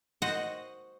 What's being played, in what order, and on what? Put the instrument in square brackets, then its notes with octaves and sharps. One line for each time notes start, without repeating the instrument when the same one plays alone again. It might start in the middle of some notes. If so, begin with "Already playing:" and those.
[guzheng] F#4 C5 D#5 F#5